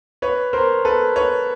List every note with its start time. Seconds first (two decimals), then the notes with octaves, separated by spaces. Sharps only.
0.22 B4 C#5
0.53 A#4 C5
0.85 A4 B4
1.16 B4 C#5